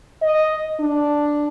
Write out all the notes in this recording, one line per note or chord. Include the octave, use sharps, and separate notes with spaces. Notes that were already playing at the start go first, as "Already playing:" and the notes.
D#5
D4